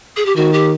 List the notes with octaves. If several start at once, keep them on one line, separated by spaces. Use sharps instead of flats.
G#4
G4
D#3 F#4
G4